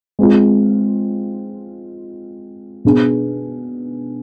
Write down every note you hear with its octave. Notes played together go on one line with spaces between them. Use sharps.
G#3 C4 F4
B2 B3 D4 G#4